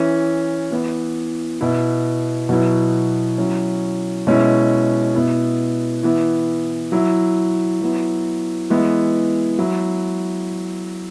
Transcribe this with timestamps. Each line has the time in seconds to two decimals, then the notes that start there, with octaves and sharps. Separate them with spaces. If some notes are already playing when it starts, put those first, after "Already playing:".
Already playing: E3 C#4 E4
0.71 E3 B3 E4
1.61 B2 B3 E4
2.49 B2 F#3 B3 E4
3.38 F#3 C#4 E4
4.27 B2 G#3 C#4 E4
5.15 B2 B3 E4
6.03 E3 B3 E4
6.92 F#3 E4
7.81 F#3 B3 E4
8.70 E3 G#3 B3 E4
9.59 F#3 E4